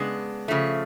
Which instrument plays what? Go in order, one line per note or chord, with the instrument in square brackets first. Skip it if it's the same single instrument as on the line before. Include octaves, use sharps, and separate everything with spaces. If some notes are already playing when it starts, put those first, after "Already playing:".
Already playing: [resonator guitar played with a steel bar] C#3 G#3 B3 D4
C#3 F3 A3